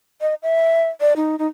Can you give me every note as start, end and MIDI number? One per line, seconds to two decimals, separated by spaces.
0.21 0.34 75
0.43 0.88 76
1.01 1.13 74
1.16 1.36 63
1.39 1.47 63